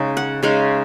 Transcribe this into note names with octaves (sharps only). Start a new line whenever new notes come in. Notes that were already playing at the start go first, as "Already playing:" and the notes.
Already playing: C#3 G#3 D#4
F#5
C#3 G#3 D#4 F5